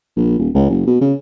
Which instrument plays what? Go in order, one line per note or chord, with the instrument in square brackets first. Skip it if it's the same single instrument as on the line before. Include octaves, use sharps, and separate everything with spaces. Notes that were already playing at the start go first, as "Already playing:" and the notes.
[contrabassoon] A#1
D#1
C#2
F#1
B2
C#3